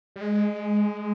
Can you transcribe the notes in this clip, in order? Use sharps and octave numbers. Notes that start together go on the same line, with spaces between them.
G3
G#3